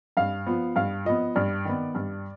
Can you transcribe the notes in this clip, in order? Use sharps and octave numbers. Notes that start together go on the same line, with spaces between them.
G2 F5
F3 B3
G2 F5
F3 B3 D#5
G2 D5
D#3 B3
G2